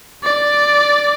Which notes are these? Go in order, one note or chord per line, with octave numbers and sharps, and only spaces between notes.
D5